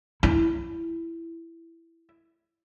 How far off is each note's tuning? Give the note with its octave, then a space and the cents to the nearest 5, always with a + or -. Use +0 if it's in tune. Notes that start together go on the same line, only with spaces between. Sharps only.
E4 +10